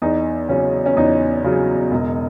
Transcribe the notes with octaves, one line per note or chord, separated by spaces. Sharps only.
E2 D#4
C#3 F#3 C#4
C#4
E2 D#4
C#3 F#3
E1